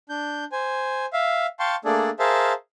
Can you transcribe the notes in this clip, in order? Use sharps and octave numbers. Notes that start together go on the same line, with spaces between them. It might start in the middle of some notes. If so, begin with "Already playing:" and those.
D4 G6
C5 G#5
E5 F5
F5 G5 A5 C6 C#6
A3 A#3 D4 G#4 A4 D5
G#4 A#4 C5 E5 F5 A5